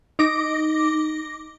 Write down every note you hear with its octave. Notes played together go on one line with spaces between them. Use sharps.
D#4 D6 A#6